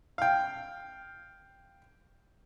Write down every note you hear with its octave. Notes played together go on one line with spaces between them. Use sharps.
F5 G5